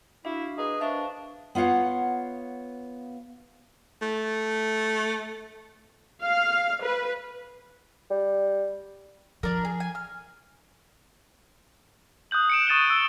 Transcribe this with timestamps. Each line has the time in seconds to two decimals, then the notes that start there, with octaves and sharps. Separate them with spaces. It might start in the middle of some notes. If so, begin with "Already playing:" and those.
0.25 D4 E4 F#4 E5 F5
0.58 G#4 B4 C#5 D#5 A#5
0.81 D4 A#4 C5 E5 F5 C#6
1.55 B3 F4 C#5 F5 F#5
4.02 A3
6.23 F5
6.83 B4
8.10 G3
9.43 F3 D4 A#4
9.65 G#4
9.80 G#5
9.95 F6
12.31 D#6 F#6 G6 F#7
12.50 C#7 D7 E7
12.67 C#6 D#6 A6 D#7 E7 G7
12.90 E6 G7